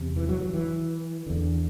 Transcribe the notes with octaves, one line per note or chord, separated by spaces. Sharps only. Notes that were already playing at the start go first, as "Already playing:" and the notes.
Already playing: E2 C3
E3
F#3
F#3
E3
E2 D3